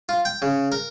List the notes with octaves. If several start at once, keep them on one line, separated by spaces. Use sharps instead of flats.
F4
G5
C#3
A#4